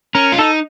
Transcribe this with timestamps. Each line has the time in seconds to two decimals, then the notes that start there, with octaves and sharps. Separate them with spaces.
0.15 C#4 A#4
0.32 F4
0.38 D#4 A4